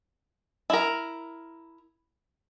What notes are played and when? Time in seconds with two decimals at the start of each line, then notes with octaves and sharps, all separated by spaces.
0.70 E4 A#4